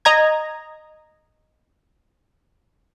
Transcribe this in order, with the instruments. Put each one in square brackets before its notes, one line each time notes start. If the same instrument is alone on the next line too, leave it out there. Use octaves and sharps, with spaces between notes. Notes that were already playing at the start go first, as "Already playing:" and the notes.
[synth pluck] D#5 A#5 G#6